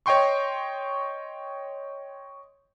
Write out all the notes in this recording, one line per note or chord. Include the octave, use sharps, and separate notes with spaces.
C#5 D#5 G5 C6 C#6